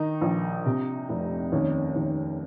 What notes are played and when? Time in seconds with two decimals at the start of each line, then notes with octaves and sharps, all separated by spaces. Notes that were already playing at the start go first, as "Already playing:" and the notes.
Already playing: D#3 D#4
0.21 A#1
0.66 C3
1.09 F1
1.52 D#2 C#4
1.96 D#2